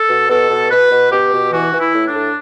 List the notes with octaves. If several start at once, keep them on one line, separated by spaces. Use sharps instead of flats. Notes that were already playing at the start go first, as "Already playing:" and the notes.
Already playing: A4
B2
B2 A4
B2
B2 B4
B2
B2 G4
B2
E3 F#4
E3
E4
A2
D4
A2